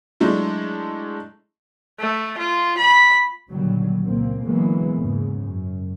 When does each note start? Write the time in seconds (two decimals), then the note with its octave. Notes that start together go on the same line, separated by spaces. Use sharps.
0.20 F#3 G#3 A3 D4 E4
2.00 A3
2.38 F4
2.78 B5
3.50 A#2 D3 D#3 F#3 G3
4.06 C#2 A#2 A#3 C4
4.43 D3 E3 F#3 G#3 A#3 B3
4.93 E2 G#2 C#3
5.43 F#2